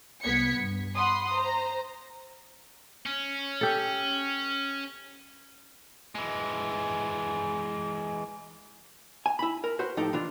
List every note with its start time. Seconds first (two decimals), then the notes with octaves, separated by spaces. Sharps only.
0.23 C2 B3 G#6 B6 C#7
0.58 G2
0.95 F#5 B5 C6 D#6
1.32 C5 A#5
3.06 C#4
3.61 G4 A4
6.15 E3 G#3
9.26 G#5
9.39 E4 B5
9.64 A#4
9.79 F#4 B4 C5
9.97 A2 F3 D#4 G4 A4 G5
10.13 E3 D4 F4